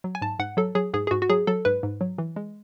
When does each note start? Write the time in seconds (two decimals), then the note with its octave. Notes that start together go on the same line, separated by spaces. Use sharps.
0.04 F#3
0.15 G#5
0.22 G#2 A5
0.39 G#2 F#5
0.57 F#3 A4
0.75 F#3 G#4
0.94 G#2 G#4
1.07 G#4
1.11 G#2 F#4
1.22 F#4
1.30 F#3 G#4
1.47 F#3 A4
1.65 G#2 B4
1.83 G#2
2.01 F#3
2.18 E3
2.36 G#3